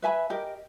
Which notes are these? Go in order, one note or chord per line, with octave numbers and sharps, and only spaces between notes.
B4 E5 G#5 B5
G4 A#4 D#5